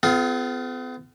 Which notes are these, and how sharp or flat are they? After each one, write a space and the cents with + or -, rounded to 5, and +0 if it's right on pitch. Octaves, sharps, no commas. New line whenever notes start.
B3 +45 F4 +0 A4 -45